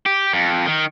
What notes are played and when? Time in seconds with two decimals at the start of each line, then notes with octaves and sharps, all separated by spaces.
0.06 G4
0.33 F2
0.66 D#3